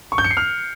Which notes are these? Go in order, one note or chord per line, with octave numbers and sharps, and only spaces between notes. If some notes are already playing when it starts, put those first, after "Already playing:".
C#6
G6
C#7
C7
F6